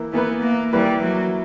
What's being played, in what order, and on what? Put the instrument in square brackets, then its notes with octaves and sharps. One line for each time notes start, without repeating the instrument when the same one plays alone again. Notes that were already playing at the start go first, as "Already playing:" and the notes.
Already playing: [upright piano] E3 A#3 E4
[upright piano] E3 A#3 E4 B4 [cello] B3
[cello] A#3
[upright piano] E3 A#3 E4 B4 [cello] G3
[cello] F#3